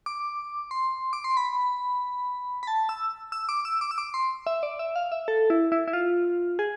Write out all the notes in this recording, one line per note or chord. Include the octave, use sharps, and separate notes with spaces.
D6
C6
D6
C6
B5
B5
A5
E6
E6
D6
E6
D6
E6
D6
C6
E5
D5
E5
F5
E5
A4
E4
E4
E4
F4
G#4